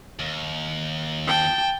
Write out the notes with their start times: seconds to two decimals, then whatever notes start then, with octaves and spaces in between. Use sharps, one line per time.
0.20 D#2
1.28 G5 A5